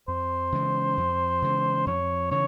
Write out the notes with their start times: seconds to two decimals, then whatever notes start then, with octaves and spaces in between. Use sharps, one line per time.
0.08 F2 C5
0.52 C#3 E3 G#3
0.97 F2
1.42 C#3 E3 G#3
1.86 F2 C#5
2.31 C#3 E3 C#5